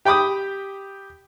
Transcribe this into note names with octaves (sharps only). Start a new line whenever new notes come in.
G4 G5 B5 D6 D#6